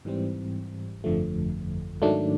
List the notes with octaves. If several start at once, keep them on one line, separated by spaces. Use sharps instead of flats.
G#2 E3 G3 C4
G1 F2 D3 F3 A3
G#2 D#3 F#3 A3 D4